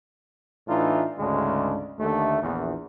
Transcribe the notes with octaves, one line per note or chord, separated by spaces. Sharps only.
A2 E3 D4 D#4 F4
D2 G#2 C#3 G#3 D4
D#2 D3 A3
A#1 E2